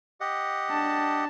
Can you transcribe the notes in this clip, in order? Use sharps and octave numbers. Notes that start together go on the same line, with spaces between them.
G4 D#5 F#5
D4 A5